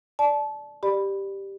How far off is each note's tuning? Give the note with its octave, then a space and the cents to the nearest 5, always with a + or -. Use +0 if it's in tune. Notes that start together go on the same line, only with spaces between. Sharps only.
D5 +0 A5 -25
G4 +0 D5 +20 B5 +0